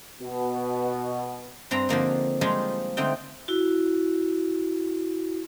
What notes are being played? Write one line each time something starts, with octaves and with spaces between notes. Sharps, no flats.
B2
G2 C4 D4 A#5
D3 F3 A#3 D#4
F3 G3 G#3 D4 D#4 F4
D3 A3 C4 D#4 G5
E4 F#4